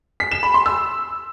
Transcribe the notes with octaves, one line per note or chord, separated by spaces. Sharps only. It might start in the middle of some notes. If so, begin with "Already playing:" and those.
B6
E7
B5
C6
E6